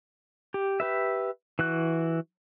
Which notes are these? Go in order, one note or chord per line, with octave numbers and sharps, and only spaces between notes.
G4
G4 B4 E5
E3 F#4 F#6